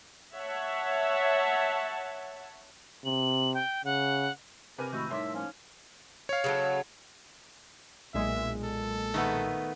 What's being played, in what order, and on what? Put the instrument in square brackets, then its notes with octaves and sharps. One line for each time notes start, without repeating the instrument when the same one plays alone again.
[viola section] C#5 E5 F#5 A5
[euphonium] C3 [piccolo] F#7
[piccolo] G5
[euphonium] C#3 [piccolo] F#5
[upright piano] C3 B4 G#5 [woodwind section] G4 A#4
[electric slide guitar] A2 D#3 [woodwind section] G#3 A3 F#4 [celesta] B5 E6 G6
[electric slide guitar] A2 G3 A#4 [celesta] D#4 C#5 [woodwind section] E5 [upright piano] C6 D6
[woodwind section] F3 A#3 C#4
[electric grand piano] C#5 F5
[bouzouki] C#3 F#3 A3
[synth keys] B1 A#2 G#3 [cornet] E5
[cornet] A4
[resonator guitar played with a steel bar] D#3 A3 B3